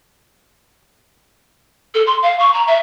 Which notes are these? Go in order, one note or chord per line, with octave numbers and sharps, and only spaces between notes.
A4
C6
F5
C#6
A#5
E5